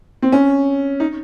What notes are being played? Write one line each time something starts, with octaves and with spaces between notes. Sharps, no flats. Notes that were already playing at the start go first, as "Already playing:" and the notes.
C4
C#4
D#4